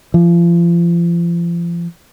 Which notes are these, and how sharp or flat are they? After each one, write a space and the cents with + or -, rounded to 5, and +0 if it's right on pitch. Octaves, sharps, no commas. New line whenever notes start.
F3 -35